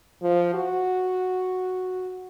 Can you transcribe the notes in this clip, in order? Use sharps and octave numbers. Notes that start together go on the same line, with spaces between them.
F3
F#4